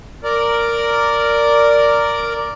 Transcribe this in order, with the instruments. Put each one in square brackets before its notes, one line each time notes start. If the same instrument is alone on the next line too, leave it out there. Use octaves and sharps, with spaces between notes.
[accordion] A#4 D5